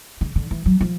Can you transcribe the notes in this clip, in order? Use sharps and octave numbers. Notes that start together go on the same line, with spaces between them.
C#3
D3
E3
F#3
F3